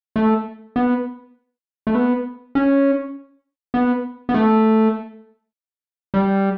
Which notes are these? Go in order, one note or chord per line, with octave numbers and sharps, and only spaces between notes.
A3
B3
A3
B3
C#4
B3
B3
A3
G3